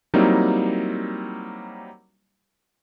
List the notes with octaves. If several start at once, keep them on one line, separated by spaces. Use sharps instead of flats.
F#3 G3 A#3 C4 D#4 E4